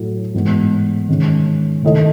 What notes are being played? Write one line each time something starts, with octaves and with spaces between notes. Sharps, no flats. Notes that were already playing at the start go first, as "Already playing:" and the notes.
Already playing: A2 F#3 A3
G#2 E3 G#3 B3
D#3 G#3 C#4
D#3 A3 E4 A4 D#5